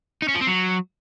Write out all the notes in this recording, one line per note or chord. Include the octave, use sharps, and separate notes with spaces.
D#4
C#4
F3
C4
F#3